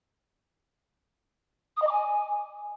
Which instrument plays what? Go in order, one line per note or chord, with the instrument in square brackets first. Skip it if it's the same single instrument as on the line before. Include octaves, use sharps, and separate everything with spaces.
[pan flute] D#6
D#5
D6
G#5